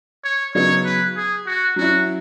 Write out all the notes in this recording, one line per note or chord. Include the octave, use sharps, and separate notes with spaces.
C#5
C#3 F#3 B3 D#4 C#5
B4
G#4
F#4
F#3 C#4 E4 F#4